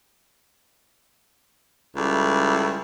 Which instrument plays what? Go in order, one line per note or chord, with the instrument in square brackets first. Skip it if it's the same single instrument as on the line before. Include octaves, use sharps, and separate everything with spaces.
[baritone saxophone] C#2 [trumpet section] G3 E4 A4